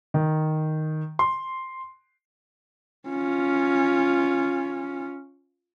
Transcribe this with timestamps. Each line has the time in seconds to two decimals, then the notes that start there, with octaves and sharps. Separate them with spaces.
0.14 D#3
1.19 C6
3.09 C#4 F4